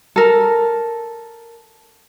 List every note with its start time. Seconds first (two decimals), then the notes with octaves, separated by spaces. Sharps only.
0.16 A4 A#4